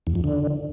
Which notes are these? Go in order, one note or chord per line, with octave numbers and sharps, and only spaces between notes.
E2
F2
D3